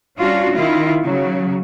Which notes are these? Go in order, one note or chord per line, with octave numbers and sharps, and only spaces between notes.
G3 C#4 D4 F4 F#4
D#3 E4 F4
C#3 F#3